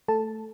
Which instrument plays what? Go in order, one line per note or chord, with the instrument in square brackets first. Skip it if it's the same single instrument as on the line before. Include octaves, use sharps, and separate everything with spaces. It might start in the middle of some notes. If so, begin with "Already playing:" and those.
[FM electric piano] A3 A4 A5